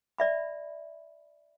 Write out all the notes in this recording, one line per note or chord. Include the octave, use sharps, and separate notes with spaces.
D5 E5 B5